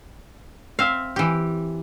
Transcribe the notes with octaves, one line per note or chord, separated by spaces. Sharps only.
C4 E5 F5
E3 G4